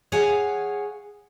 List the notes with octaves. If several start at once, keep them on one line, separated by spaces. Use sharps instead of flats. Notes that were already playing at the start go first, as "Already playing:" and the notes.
G#4 C#5 F5 F#5 G#5